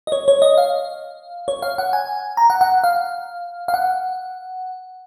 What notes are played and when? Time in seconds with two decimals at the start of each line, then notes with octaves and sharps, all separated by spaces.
0.07 D#5
0.12 C#5
0.28 C#5
0.42 D#5
0.58 F5
1.48 C#5
1.62 F5
1.78 F#5
1.93 G#5
2.37 A#5
2.50 F#5
2.61 F#5
2.84 F5
3.68 F5
3.74 F#5